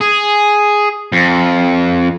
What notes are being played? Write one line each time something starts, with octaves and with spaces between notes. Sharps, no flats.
G#4
F2